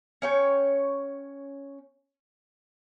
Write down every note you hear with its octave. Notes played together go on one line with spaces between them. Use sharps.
C#4 C#5 G5